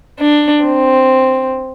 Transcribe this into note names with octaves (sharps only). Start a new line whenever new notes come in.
D4
C4